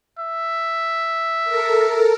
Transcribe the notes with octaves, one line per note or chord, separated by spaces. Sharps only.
E5
A4 A#4